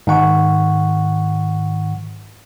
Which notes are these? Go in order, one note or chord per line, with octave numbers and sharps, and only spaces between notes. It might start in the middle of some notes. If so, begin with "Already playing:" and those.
G#2 D#3 F#5 C#6